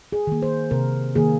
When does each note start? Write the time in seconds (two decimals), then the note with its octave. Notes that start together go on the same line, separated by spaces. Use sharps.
0.12 G#4
0.27 D#3 A#3
0.42 C5
0.71 C3 A#4
1.15 D#3 A#3 G#4